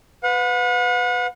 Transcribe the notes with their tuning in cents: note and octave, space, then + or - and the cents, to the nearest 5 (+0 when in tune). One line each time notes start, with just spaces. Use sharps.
B4 +15 F#5 -40